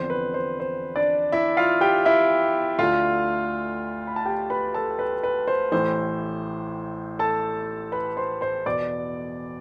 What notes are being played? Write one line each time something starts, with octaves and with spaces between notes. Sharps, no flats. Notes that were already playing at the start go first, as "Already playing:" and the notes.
Already playing: E2 D3 F3 C4 C5
B4
C5
C5
D4 D5
E4 E5
F4 F5
G4 G5
E4 E5
D2 D3 A3 F4 F5
B5
A5
G4 G5
B4 B5
A4 A5
B4
B4
C5
A1 A2 E3 C5
A4 A5
B4 B5
C5 C6
C5 C6
E2 B2 B3 D5 D6